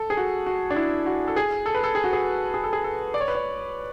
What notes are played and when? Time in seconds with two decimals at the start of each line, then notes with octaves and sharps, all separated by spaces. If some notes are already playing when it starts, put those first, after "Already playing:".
Already playing: A4
0.10 G#4
0.17 F#4
0.46 F#4
0.70 D4
0.76 E4
1.06 F#4
1.28 A4
1.36 G#4
1.66 A4
1.75 B4
1.84 A4
1.95 G#4
2.04 F#4
2.13 G#4
2.54 G#4
2.64 A4
2.73 G#4
2.84 A4
3.14 D5
3.20 C#5
3.28 B4
3.35 C#5